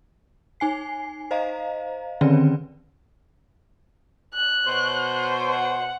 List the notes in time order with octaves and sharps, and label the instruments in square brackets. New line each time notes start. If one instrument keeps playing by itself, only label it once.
[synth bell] D#4 G#5 C7
C5 D#5 F5 A#5
D3 D#3 C4 C#4 B4 D5
[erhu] F#6
[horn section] B2 C5 C#5
[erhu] F#5